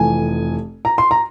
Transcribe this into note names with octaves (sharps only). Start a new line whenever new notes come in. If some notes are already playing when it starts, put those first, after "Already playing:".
Already playing: F1 F2 E3 G#5
A#5
C6
A#5